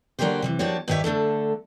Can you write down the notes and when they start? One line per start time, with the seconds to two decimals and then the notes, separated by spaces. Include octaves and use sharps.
0.19 D3 F#3 A#3 D4 G4 C5
0.42 C3 D#3 E3
0.59 F3 A#3 D4 F#4 G4 C#5
0.88 G2 D#3 G4 B4 C#5 E5
1.04 D3 A3 D4 A4